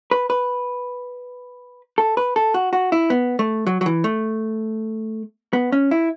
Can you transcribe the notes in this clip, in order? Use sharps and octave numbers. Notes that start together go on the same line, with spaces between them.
B4
B4
A4
B4
A4
F#4
F#4
E4
B3
A3
F#3
F#3
E3
A3
B3
C#4
E4